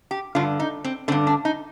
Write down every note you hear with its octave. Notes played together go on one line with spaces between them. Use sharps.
G4
G2 D3 F4
D#4
C4
G2 D3 C4
D4
D#4